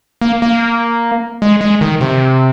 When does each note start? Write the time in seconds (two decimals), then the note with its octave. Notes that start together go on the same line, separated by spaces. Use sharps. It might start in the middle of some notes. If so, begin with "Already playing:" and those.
0.21 A#3
0.42 A#3
1.42 G#3
1.61 G#3
1.81 D#3
2.01 C3